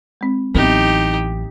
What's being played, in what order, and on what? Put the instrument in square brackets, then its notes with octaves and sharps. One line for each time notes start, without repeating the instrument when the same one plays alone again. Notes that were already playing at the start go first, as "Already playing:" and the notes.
[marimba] G#3 C4
[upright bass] A1 E3 [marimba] F#3 B3 C4 [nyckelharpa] D#4 G4